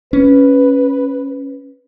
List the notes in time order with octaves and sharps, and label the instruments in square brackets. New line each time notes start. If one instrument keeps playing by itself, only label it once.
[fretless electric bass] C#4 [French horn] B4